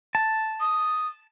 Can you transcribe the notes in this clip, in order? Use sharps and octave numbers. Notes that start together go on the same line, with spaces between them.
A5
D#6